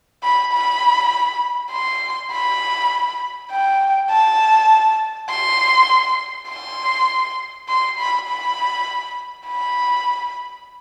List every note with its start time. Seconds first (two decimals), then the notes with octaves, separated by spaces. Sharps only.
0.24 B5
0.52 B5
1.72 C6
2.32 B5
3.52 G5
4.10 A5
5.30 C6
6.49 C6
7.68 C6
7.98 B5
8.28 B5
9.47 B5